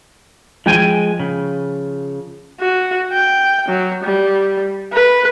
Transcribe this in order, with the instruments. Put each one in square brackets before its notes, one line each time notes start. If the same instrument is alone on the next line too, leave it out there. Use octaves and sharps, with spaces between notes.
[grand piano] F3 D#7 [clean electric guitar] G#3 G5 G#5
[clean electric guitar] C#3
[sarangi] F#4
G5
F#3
G3
B4